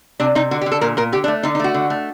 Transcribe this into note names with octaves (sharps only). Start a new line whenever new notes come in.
C3 D4
C3 D#4
D3 F#4
G4
D3
A4
A#2 A#4
A#2 A#4
D3 G4
D4
A3
D3 D#4
D#4
A3 F#4
D3
A3